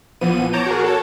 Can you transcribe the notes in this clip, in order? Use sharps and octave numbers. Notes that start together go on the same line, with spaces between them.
A#1 E3 F3 B3 D#7
C#5 A5 A#5 D6 G6
F#4 G#4 A#4
A4 C#5 A5